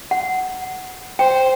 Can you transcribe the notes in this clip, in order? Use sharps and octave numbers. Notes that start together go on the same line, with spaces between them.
F#5
C5 G5